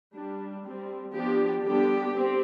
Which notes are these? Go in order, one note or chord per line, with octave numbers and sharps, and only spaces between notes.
G3 D4
G3 C4
F3 B3 D4 G4
D3 G3 B3 D4 G4
C4